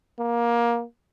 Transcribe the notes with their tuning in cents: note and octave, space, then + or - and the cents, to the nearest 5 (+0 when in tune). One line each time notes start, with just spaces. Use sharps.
A#3 +20